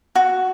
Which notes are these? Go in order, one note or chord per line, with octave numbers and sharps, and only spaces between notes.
F#4